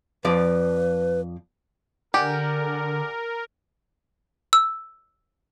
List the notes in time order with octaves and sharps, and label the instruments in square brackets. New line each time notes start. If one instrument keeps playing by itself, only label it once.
[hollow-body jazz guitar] F2 F3 D5 [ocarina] B4
[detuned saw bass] D3 [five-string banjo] G4 [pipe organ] A#4 [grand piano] D5 F#5 G#5
[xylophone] E6